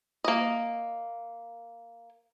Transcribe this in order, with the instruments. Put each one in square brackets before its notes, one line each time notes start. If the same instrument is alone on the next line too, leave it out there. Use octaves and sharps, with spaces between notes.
[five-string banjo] A#3 D#5